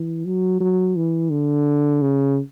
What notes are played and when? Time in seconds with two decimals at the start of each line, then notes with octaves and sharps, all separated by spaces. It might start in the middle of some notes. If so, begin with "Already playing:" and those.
Already playing: E3
0.25 F#3
0.60 F#3
0.96 E3
1.31 D3
2.02 C#3